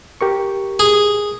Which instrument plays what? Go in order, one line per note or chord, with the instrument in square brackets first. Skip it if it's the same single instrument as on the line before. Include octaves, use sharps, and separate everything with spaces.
[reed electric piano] G4 A#4 C#6
[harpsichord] G#4